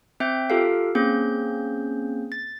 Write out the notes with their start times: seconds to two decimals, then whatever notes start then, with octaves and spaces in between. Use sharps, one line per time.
0.20 C4 E5 G5 G6
0.50 F4 G4 A4 A#4 F5
0.95 A#3 C4 C#4 G#4 G6
2.32 A6